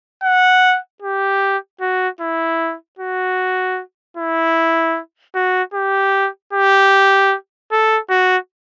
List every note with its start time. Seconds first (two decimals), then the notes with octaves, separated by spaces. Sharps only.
0.23 F#5
1.02 G4
1.81 F#4
2.20 E4
2.99 F#4
4.17 E4
5.35 F#4
5.74 G4
6.53 G4
7.71 A4
8.10 F#4